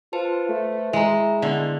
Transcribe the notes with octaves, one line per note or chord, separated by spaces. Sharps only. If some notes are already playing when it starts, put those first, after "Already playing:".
F4 B4 C5 A5
A3
G#3 E4 E5 A#5
D3 B3 D5